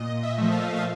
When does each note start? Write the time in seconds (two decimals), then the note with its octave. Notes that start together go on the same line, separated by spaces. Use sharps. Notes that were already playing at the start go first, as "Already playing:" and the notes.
Already playing: A#2 D#5
0.23 E5
0.38 F3 A3
0.52 F5
0.76 F5